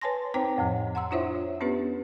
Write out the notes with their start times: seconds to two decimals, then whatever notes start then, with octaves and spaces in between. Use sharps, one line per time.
0.01 B4 C#5 G#5 A5 C6 A#6
0.34 C4 D#4 C5 C#5 G5 A#5
0.58 F2 A2 F3
0.95 F#5 A#5 C6 E6
1.11 D4 E4 F4 C5 C#5 E5
1.61 B3 C#4 D4 G4 B4